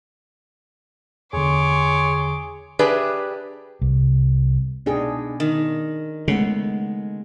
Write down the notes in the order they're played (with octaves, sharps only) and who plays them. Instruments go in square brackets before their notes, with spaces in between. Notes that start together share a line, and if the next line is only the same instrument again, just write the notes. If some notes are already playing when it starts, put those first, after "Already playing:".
[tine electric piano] E2 D3 [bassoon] G#4 [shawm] C#5 [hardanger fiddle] C6 D6
[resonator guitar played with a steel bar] D4 G4 G#4 B4 D5 E5
[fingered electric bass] C2
[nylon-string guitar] B2 D#4 G5 [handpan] D4 G#4
[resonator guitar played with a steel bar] D#3
[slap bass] C#3 [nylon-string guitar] G#3 A3 B3